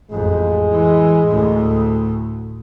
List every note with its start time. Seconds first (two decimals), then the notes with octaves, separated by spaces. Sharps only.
0.11 A1 F2 G#3
0.72 E3
1.27 D2 A2